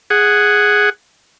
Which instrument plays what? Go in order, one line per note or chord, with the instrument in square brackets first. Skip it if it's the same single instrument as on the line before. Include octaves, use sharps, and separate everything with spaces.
[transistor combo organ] G#4 F#5